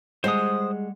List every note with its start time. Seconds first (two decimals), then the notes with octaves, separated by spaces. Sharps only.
0.24 G3 G#3 C5 F#5 D#6